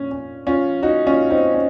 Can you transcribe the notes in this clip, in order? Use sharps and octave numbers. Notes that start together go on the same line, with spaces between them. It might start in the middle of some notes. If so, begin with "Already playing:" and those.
Already playing: A#2 C#4
C#4
C#4 F4
D#4 F#4
C#4 F4
C4 D#4
C#4